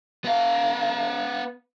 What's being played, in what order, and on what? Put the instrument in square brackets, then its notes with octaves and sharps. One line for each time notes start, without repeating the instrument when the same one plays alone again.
[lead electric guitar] B3 F5